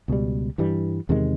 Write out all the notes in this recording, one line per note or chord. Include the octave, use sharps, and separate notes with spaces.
C#2 B2 G3
G2 E3 G3
E2 C3 D#3 G#3